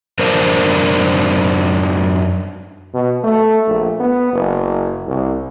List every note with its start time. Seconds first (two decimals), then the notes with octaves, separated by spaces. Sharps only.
0.19 F#2 D4 A#4 C5
2.94 B2
3.24 A3
3.67 A#1
3.99 B3
4.33 F#1
5.07 C2